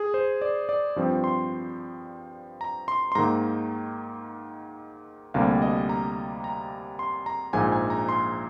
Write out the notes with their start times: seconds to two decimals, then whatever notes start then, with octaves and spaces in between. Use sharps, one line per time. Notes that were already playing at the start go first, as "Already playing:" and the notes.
Already playing: G#4
0.14 C5
0.42 D5
0.69 D5
0.96 G2 F3 C4
1.24 C6
2.61 A#5
2.88 C6
3.12 C6
3.15 G#2 D#3 A#3 A#5
5.34 D2 C3 G3 A#3 F5
5.62 D#5
5.89 A#5
6.44 A#5
6.99 C6
7.26 A#5
7.53 A#1 G#2 F3 A#3 G#5
7.72 G#5
7.90 A#5
8.09 C6